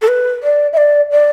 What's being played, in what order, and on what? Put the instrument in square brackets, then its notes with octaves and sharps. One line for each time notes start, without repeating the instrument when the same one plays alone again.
[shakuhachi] A4
B4
D5
E5
D5
D5